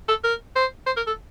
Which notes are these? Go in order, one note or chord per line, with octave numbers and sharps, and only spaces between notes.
A4
A#4
C5
C5
A#4
A4